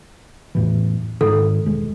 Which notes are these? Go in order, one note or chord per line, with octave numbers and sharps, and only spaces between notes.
E2 A2 E3
G#2 D#3 A4
E1 G#3